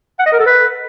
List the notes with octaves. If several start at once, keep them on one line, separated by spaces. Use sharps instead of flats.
F#5
D#5
A#4
A4
B4